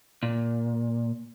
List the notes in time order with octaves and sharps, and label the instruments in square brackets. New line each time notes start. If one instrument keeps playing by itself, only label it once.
[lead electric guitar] A#2